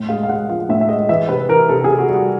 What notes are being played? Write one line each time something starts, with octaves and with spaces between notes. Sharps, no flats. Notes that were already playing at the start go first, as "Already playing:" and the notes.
Already playing: A2
G#3 F5
F5
G#3 F#5
F3 F5
A2 E5
E5
G#3 D#5
E3 E5
C3 B4
E3 A#4
C3 A4
G#4
C3
F#4
G3
F#4